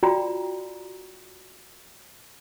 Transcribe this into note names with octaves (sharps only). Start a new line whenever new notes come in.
F4 F#4 D5 G5 A#5